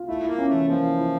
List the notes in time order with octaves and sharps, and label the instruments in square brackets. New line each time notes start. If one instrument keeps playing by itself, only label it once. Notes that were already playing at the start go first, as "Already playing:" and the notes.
Already playing: [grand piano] F4
[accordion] A3 [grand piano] E4
[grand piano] E4
[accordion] A#3
[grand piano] C#4
[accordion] A3
[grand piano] E3
[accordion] F3 [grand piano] A#3
[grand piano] E4
E4